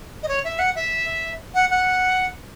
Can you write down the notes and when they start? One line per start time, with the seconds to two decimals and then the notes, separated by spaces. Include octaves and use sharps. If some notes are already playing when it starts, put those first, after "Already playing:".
0.23 D#5
0.28 C#5
0.44 E5
0.59 F#5
0.76 E5
1.54 F#5
1.70 F#5